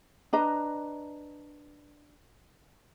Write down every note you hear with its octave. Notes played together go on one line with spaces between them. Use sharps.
D4 B4 D#5 A#5